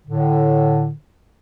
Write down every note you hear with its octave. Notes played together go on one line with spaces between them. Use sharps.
A2 D3